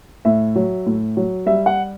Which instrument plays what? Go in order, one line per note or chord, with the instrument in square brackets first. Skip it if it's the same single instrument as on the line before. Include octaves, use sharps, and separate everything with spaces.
[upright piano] A2 E5
F#3
A2
F#3
G3 E5
F#5